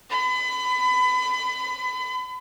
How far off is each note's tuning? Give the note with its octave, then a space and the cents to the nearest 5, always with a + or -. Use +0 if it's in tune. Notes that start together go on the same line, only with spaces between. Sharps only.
B5 +30